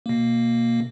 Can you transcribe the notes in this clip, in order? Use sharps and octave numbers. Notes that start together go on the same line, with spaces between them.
B2 A#3